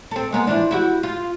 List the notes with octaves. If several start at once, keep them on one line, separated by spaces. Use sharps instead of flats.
C4 A4
G#3 A#3 B3
E3 F3 D4
E4 F#4 G4
F4